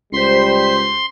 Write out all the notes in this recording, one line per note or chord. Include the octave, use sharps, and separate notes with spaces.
C#2 G3 C5 C6 B6